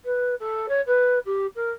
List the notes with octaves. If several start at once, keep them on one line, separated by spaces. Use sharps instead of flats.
B4
A4
C#5
B4
G4
A#4